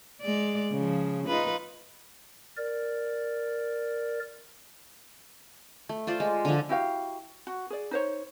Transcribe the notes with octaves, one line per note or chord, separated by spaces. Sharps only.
G#3 D5
C#3 F3
D#4 F4 B4
A#4 D5
A3
F4 C5 D5
G#3
D3 F3
E4 F#4 G4 F5
F#4
G#4 D5
D#4 C5 C#5